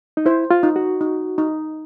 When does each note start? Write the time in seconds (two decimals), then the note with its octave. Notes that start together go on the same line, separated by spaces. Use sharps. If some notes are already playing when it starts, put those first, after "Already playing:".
0.17 D#4
0.26 E4 C5
0.51 F4
0.63 D#4
0.76 F#4
1.01 D#4
1.38 D#4